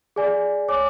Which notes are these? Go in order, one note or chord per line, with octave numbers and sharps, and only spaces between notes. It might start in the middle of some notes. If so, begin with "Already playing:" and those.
G#4 D5 G#5
C#5 G#5 D6